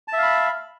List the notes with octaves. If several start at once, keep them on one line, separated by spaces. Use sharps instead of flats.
E5 F5 A5 B5